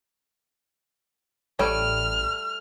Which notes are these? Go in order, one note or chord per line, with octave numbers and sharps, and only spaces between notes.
A1 G3 A3 C#5 G5 F6